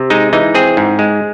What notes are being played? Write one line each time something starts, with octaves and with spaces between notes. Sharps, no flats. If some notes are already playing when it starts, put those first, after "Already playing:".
Already playing: C3
G#3 D#4
E3 D#4
C4 G#4
G#2
G#3